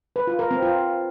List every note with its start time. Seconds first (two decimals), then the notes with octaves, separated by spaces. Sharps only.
0.16 B4
0.27 F4
0.39 A#4
0.51 C4
0.62 F4